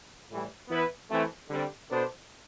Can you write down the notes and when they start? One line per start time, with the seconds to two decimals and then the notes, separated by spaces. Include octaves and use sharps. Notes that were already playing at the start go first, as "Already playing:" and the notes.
0.29 A2 E3 G3
0.69 E3 B3 E4 B4
1.08 E3 A3 C4
1.49 D3 G3 C4
1.89 B2 B3 D4 A4 C5